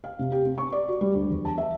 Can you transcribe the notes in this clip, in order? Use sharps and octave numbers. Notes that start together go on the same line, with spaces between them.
F5
C3
G4
C4
C#6
D5
F#4
G3
D2
E2
A5
E5